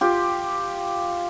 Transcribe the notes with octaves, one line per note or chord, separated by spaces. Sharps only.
F4 G4